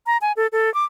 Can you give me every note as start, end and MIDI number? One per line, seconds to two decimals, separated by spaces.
0.06 0.17 82
0.21 0.32 80
0.37 0.47 69
0.52 0.72 69
0.74 0.84 86